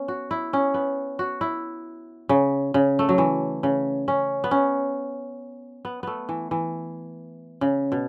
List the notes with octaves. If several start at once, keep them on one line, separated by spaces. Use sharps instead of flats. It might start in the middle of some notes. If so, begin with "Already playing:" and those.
Already playing: B3 C#4
F#4
E4
C#4
B3
F#4
E4
C#3
C#3
A3
F#3
E3
C#3
C#4
B3
C#4
B3
A3 B3
E3
E3
C#3
B2